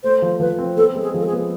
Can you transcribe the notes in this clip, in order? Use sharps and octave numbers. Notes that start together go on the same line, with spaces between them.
A3 C5
F3
F3 B4
C4
B3 A4
G#3
G#4
F3
A4
G#4
B3